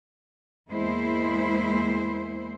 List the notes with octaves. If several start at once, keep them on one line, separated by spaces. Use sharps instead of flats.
E2 G#3 A#3 E4 C5